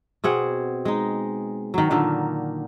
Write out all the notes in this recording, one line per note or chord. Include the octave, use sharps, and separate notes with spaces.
B2 C4 G#4 F#5
G#3 D#4
D#3 F#3
A#2 D3 D#3 A#3